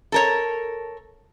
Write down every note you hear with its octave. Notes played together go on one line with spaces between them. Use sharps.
A4 A#4 C#5